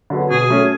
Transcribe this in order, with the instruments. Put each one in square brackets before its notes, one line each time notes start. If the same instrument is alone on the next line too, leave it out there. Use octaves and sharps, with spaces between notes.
[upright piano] D3 F#3 B3
[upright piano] B2 [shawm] G#4
[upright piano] F#3 A3 C#4